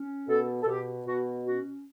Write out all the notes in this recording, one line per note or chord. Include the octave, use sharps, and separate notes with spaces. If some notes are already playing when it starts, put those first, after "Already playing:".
Already playing: C#4
B2 A4
A4
B2 G4
B2 F#4
C#4 F#4